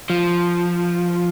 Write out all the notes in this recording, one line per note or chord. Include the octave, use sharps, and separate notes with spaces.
F3